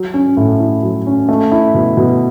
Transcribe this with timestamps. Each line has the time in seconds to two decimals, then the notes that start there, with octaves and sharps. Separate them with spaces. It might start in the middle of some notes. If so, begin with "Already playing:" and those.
Already playing: F#3
0.14 C#4
0.37 A2
0.60 E4
0.83 F#3
1.06 C#4
1.29 A3
1.52 E4
1.74 B2
1.97 B2